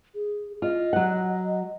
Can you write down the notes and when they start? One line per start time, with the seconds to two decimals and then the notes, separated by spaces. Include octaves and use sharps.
0.15 G#4
0.62 F4 D#5
0.93 F#3 F#5